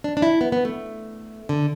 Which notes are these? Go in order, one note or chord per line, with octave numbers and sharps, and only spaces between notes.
D4
D4
E4
B3
B3
A3
D3